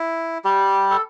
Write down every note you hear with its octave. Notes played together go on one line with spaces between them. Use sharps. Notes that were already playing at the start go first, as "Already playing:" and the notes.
Already playing: E4
G3 G4
A4